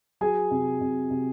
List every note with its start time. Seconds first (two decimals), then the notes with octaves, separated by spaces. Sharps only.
0.21 F#3 G#4 G#5
0.51 C3
0.81 C3
1.10 C3